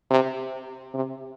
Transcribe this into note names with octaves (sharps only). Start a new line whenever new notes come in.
C3
C3